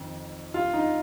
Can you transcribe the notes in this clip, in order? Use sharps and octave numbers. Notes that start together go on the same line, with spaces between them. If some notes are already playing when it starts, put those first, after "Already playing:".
Already playing: F2 D#3
F4
D#4